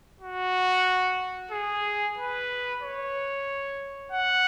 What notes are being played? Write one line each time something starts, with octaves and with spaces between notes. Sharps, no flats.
F#4
G#4
B4
C#5
F#5